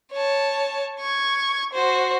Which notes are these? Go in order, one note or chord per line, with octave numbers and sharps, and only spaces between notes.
C#5 A5
C#6 G#6
F#4 C5